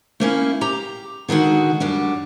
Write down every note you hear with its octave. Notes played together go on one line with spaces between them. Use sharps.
A3 A#3 C#4 E4
G4 A#5
D3 D#3 G#3 F#4
F#2 G3 D4